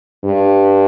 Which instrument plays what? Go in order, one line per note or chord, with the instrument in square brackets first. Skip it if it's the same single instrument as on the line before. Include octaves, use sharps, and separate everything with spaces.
[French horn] G2